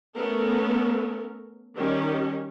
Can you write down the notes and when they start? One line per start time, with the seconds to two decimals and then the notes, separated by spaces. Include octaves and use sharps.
0.16 A3 B3 C#4 A4 A#4
1.75 D#3 G3 C#4 G4